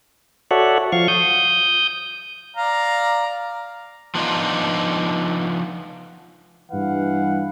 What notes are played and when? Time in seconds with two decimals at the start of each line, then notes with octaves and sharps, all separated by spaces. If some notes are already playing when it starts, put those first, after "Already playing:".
0.51 F#4 A4 C#5 D5 E5 F#5
0.92 F3 F5 C#6
1.08 D#6 G6
2.57 D5 F5 A#5
4.15 F3 B3 D4 D#4 F4
6.71 G2 E3 B4 F5 F#5